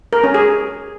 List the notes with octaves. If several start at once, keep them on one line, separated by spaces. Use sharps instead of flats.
A#4
C#4
G#4